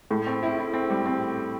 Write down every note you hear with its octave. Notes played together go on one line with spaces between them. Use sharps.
A2
C4
E4
E4
C4
G3
C4